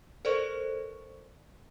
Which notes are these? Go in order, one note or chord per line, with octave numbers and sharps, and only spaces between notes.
A4 A#4 C5 D5 C#6